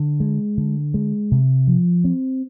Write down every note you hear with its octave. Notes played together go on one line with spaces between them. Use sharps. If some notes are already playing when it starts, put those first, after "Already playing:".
Already playing: D3
G#3
D3
G#3
C3
F3
C4